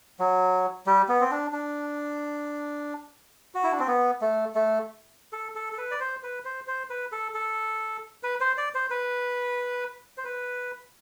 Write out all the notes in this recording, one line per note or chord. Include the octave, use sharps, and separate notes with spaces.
F#3
G3
B3
C4
D4
D4
F#4
E4
D4
C4
B3
A3
A3
A4
A4
A4
B4
D5
C5
B4
C5
C5
B4
A4
A4
B4
C5
D5
C5
B4
C5
B4